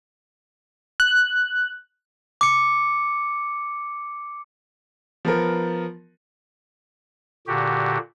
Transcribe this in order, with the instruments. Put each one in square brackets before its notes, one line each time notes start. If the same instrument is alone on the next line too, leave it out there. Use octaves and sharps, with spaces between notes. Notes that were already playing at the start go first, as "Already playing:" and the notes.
[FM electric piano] F#6
[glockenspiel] D6 C#7
[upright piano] F3 B3 A#4
[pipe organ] A#2 D3 F#4 G4